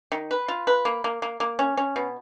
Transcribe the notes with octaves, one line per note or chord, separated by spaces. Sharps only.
D#3
B4
F4
B4
A#3
A#3
A#3
A#3
C#4
C#4
B2